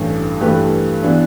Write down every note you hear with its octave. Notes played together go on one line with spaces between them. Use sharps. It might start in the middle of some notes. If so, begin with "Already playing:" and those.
Already playing: A1 G2 E3 A3
G2 E3 A3 G4 B4
E3 B3 D4